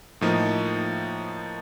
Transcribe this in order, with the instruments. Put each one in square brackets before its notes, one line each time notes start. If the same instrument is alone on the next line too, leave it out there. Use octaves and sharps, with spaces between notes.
[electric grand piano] A2 F3 A#3 D#4